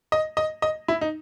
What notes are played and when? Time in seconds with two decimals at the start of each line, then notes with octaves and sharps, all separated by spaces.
0.12 D#5
0.37 D#5
0.62 D#5
0.88 E4
1.01 D#4